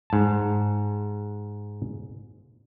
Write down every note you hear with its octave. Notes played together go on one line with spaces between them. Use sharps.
G#2 A5